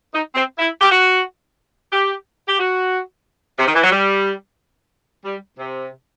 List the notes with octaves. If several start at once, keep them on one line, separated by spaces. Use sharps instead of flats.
D#4
C4
E4
G4
F#4
G4
G4
F#4
C3
D#3
E3
F#3
G3
G3
C3